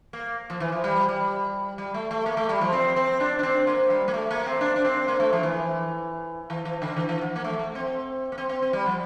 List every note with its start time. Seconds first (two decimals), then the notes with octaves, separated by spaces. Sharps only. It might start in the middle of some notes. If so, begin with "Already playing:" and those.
0.13 A#3
0.50 F3
0.60 E3
0.72 F3
0.84 G3
1.08 G3
1.78 G3
1.94 A3
2.11 A3
2.26 A#3
2.37 A3
2.49 G3
2.61 F3
2.72 C4
2.96 C4
3.20 D4
3.39 D4
3.43 C4
3.67 A#3
3.90 G3
4.08 A#3
4.14 A3
4.31 A#3
4.46 C4
4.61 D4
4.76 D4
4.85 C4
5.08 A#3
5.20 A3
5.33 F3
5.43 E3
6.50 E3
6.65 E3
6.82 D3
6.96 E3
7.09 E3
7.21 F3
7.36 A#3
7.44 A3
7.59 A3
7.75 C4
8.32 A#3
8.38 C4
8.49 C4
8.62 C4
8.73 G3
8.86 F3